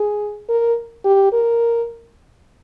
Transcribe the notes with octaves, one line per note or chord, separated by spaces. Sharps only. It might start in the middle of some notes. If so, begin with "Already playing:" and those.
Already playing: G#4
A#4
G4
A#4